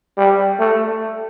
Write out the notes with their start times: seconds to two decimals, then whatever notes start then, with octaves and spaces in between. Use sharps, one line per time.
0.18 G3
0.59 A3